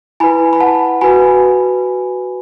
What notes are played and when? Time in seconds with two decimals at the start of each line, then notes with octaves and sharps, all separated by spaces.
0.20 E4 B4 G#5 B5
0.53 B5
0.60 F#5 A5
1.01 F#4 B4 G#5 B5